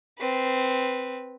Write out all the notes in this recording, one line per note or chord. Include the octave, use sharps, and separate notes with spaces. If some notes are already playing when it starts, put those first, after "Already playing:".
C4 B4